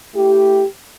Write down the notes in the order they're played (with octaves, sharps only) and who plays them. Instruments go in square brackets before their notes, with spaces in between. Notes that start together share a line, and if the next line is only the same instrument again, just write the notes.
[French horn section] A3 E4 G4